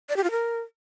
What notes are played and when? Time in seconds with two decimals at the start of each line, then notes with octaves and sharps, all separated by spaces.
0.09 D5
0.16 G4
0.24 F4
0.31 A#4